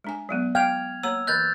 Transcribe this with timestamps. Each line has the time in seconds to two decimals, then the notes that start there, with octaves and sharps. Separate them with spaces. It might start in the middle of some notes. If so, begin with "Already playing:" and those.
0.04 G#3 D4 G#5
0.29 F#3 G#3 B3
0.55 F5 G5 F6 G#6 F7
1.03 A#3 C#5 A#5 E6
1.27 E3 A#4 D#5 F#6 G6 A6